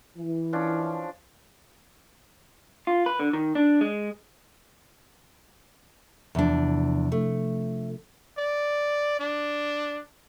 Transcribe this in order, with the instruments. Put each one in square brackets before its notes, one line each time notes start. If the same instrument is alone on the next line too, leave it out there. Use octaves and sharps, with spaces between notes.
[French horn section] E3
[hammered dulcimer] F3 C#4 D4
[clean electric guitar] F4
B4
D3
D#3
D4
G#3
[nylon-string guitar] E2 D4 [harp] C3 F3
[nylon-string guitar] A3
[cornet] D5
D4